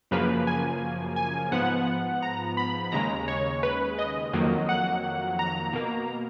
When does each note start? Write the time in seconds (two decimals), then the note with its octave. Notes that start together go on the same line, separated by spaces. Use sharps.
0.11 F#2 C#3 F3 A#3 B4
0.47 G#5
1.16 G#5
1.52 G#2 F3 B3 F#5
2.22 A#5
2.57 B5
2.92 D#2 C#3 G#3 A#5
3.28 C#5
3.63 B4
3.99 D#5
4.33 F2 D#3 F#3 A#3
4.69 F#5
5.39 A#5
5.73 B2 A#3